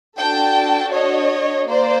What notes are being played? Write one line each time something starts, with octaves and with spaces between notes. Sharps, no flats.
D4 F#4 A4 G5 A5
C#5 D#5
A#3 C5 D5